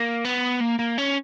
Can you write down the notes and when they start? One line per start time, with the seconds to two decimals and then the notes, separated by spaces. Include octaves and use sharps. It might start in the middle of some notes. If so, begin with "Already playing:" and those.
Already playing: A#3
0.25 B3
0.61 A#3
0.79 A#3
0.98 C#4